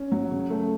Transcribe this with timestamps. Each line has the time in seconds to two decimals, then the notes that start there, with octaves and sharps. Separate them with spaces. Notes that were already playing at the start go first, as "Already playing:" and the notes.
Already playing: C#4
0.12 F#3
0.31 C#3
0.50 A3